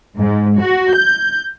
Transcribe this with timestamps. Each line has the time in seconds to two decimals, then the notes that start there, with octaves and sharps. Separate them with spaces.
0.16 G#2
0.59 F#4
0.92 G6